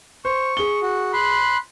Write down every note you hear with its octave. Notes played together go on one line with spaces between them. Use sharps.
C5 C#6
G#4 G7
F#4
B5 C6 F#6